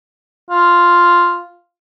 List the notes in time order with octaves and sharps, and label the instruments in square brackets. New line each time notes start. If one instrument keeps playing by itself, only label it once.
[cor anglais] F4